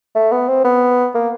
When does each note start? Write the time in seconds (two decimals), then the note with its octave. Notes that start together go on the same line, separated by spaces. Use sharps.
0.15 A3
0.32 B3
0.48 C4
0.64 B3
1.15 A#3